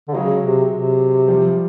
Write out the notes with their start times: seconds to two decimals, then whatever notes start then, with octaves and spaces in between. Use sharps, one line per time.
0.08 D3
0.14 C#3 F#3 G#3
0.43 C3
0.72 C3
1.28 F3 G3